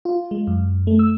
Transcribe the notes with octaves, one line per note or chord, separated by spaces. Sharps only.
F4
G#3
F#2
A3
E6